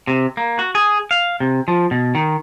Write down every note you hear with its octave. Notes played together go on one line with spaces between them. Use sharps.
C3
A#3
F#4
G#4
F5
C3
F3
B2
D#3